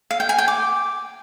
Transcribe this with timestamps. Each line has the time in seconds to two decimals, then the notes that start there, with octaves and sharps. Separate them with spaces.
0.11 F5
0.20 G5
0.29 G#5
0.38 G5
0.48 D6